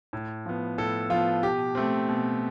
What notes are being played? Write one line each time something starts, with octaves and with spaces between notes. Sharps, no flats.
A2
F3 B3
A2 A4
F3 B3 F4
B2 G4
A3 C4
B2